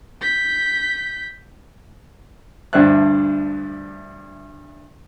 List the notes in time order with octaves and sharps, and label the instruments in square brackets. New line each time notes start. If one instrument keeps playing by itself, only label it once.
[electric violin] G6 B6
[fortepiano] D2 G2 D4 C5 E5 F#6